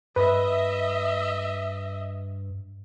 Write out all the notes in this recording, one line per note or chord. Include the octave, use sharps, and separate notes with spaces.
G2 B4 D#5 E5